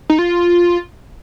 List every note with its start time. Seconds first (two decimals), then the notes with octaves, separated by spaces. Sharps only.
0.10 D#4
0.19 F4